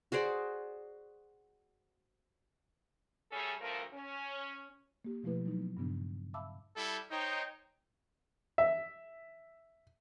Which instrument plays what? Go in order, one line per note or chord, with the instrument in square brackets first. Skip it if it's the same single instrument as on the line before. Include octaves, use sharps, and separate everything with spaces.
[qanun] F#4 G#4 C5 D5
[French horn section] G3 A3 C#4 G#4 A4
D2 G2 F3 A3 A#4
C#4
[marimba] A#3 G4
B2 F3 A3 E4 B4
F#3 D#4
B3
G2 A#2 C#3 B3 D4
E5 F5 A5 B5 D6 E6
[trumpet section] G3 E4 A4
[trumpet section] D#4 [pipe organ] C5 C#5 G5
[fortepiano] E5